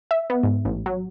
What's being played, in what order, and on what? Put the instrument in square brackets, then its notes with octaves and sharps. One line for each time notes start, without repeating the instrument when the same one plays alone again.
[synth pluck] E5
B3
G#2
A1
F#3